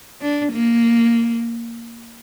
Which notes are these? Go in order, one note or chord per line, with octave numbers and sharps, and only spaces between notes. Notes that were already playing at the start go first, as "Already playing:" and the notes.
D4
A#3